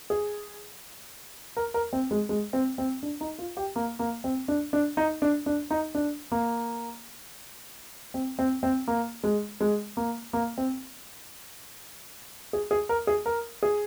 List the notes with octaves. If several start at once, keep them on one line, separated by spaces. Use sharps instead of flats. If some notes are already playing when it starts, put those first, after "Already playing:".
G#4
A#4
A#4
C4
G#3
G#3
C4
C4
D4
D#4
F4
G4
A#3
A#3
C4
D4
D4
D#4
D4
D4
D#4
D4
A#3
C4
C4
C4
A#3
G#3
G#3
A#3
A#3
C4
G#4
G#4
A#4
G#4
A#4
G#4